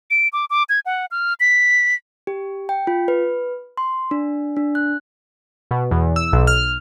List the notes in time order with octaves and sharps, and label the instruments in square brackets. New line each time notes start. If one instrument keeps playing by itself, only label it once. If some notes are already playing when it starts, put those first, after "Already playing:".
[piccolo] D7
D6
D6
G#6
F#5
F6
B6
[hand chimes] G4
G5
F4
B4
C6
D4
D4
F#6
[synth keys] B2
E2
E6
B1
F6